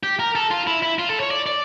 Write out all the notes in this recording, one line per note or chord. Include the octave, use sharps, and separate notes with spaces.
G4
A#4
A4
F4
E4
E4
F4
A4
C#5
D5
D5